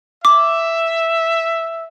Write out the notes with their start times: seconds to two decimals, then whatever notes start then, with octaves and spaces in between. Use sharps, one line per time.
0.25 E5 D6